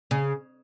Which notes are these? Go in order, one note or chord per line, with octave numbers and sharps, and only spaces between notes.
C#3